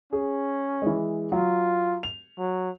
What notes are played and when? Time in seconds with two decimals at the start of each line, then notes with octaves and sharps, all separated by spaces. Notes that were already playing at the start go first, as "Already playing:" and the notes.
0.13 C#4 G#4
0.82 E3 G#3
1.32 F#3 F4
2.03 F7
2.39 F#3